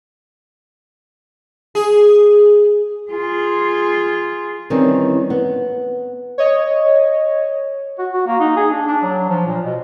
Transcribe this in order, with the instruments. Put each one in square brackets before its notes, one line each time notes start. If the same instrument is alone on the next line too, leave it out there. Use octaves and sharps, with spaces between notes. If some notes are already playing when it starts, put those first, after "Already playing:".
[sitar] G#4
[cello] F4 G#4
[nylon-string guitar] D#3 E3 G3 C4 C#4
B3
[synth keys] C#5 D#5
[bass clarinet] F#4
F#4
A#3
D#4
G#4
D4
D4
F#3
F3
A#2
B2